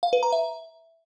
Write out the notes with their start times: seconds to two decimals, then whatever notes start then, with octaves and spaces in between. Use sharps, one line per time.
0.03 F5
0.13 B4
0.23 A#5
0.32 E5